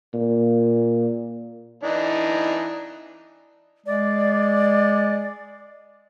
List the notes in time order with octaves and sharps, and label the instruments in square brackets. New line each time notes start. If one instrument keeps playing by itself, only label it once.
[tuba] A#2
[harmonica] E3 D4 D#4
[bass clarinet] G#3 [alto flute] D5